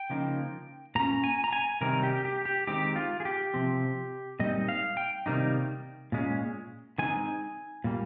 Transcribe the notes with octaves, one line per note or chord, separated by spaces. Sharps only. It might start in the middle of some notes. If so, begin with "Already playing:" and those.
Already playing: G5
C#3 F3 A#3 D#4
A#2 G3 C#4 A#5
G#5
A#5
G#5
C3 D#3 G3 C4 D#4 A#4
G4
G4
G4
D#3 G#3 C4 D#4 G4
F4
G#4
G4
C3 F3 C4
A#2 G3 C4 D#4 D#5
F5
G5
C3 D#3 G3 A#3 D#4
A#2 G#3 C#4
D#3 G#3 C4 D#4 G#5
A#2 G3 A#3